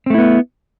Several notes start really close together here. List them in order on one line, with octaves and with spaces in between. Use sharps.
C4 A3 E4 B3